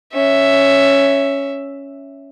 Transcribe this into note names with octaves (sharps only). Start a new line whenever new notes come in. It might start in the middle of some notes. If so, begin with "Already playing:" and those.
C#4 E5